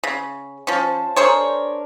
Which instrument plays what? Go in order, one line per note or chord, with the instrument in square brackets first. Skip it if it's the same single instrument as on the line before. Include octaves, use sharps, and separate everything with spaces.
[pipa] C#3
[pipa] F3 C#4 [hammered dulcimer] C5 A5
[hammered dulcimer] D4 A#4 [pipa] G#4 C5 C#5